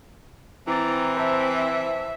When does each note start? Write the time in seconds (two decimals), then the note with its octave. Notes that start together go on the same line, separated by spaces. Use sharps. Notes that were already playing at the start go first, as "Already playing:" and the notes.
0.67 E3 C4 E4 A#5 D6 A6
1.17 C5 E5 A5